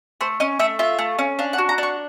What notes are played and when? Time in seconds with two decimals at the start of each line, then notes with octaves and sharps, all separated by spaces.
0.21 A3 C5
0.40 C#4 D#5
0.59 A3 E5
0.79 F4 E5
0.99 A3
1.19 C#4
1.39 D4 F5
1.53 F#5
1.58 F#4
1.69 A#5
1.78 D4 C#6